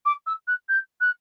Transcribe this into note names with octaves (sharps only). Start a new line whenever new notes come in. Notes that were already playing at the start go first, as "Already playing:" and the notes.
D6
E6
F#6
G6
F#6